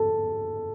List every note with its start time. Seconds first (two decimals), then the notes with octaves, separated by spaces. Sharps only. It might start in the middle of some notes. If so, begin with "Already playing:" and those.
Already playing: A4